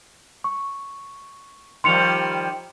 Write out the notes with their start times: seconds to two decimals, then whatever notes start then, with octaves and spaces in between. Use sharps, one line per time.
0.44 C#6
1.84 D#3 F3 G3 C6 C#7 F7